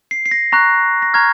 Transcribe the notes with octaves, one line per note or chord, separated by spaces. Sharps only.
C7
C7
A#6
A#5 C#6 F#6 A#6
A#6
A#5 C#6 F6 G#6